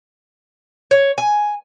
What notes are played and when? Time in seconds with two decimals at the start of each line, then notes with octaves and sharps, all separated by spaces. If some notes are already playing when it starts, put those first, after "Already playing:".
0.91 C#5
1.18 G#5